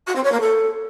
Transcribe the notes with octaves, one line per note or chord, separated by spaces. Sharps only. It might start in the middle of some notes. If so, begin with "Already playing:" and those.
F#4
C4
C#5
A#3
A4